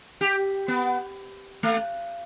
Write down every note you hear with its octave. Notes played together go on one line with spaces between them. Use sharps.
G4
B3
A3